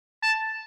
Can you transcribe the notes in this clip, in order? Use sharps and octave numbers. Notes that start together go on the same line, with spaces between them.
A5